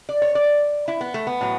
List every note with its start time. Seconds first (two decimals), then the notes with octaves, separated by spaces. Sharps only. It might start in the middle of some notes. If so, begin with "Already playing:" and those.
0.09 D5
0.22 C#5
0.35 D5
0.88 E4
1.01 B3
1.14 A3
1.27 B3
1.41 A2 F#3